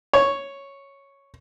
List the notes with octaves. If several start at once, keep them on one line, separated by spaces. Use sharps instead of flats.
C#5